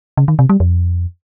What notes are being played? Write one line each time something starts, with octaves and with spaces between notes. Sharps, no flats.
C#3
D#3
C3
G3
F2